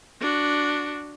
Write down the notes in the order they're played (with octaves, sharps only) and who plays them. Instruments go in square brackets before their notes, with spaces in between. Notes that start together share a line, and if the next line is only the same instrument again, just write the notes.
[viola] D4 F#4